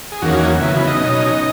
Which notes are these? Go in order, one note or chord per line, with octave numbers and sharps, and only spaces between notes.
G#4
E2 D#3 F#3 A#3 C#4 F#4
C#3 F#3 B3 E4
E4
D#4 D#5
B2 F#3 C#4